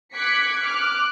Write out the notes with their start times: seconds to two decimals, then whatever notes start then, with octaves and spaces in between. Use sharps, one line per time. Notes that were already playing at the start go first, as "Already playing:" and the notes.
0.14 D6 F#6 G#6 B6 C#7
0.63 D6 F6 F#6